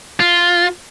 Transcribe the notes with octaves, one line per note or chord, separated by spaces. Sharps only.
F4